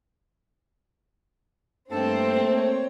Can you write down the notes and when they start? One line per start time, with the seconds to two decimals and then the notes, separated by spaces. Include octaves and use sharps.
1.91 G2 A3 A#3 C4 A4 A5
2.56 C#5